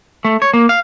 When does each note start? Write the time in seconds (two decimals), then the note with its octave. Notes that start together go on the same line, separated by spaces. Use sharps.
0.25 A3
0.42 C#5
0.54 A#3
0.69 F5